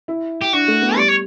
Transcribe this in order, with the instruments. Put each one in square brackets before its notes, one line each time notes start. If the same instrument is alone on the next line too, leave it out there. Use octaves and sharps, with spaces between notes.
[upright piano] E4
[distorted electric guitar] G4
[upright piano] D4 [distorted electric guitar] F#4
[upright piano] A3
B3
[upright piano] G3 [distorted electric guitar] D5
[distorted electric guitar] C#5